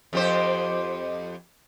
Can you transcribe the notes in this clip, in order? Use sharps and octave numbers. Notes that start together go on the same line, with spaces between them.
F2 G4 C5